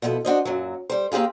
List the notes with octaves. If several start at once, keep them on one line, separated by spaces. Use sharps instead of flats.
B2 F3 B3 E4 A4
D4 F#4 C5 D#5
F#2 A#2 F#3
G3 C5
A#3 C4 G4 G#4 F5